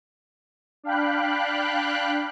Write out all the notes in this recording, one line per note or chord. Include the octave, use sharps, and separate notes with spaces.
D4 F5 G5 B5 F#6